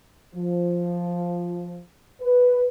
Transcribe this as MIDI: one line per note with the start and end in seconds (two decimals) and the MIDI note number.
0.35 1.80 53
2.22 2.67 71